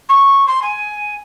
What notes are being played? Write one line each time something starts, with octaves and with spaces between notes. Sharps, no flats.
C#6
C6
G#5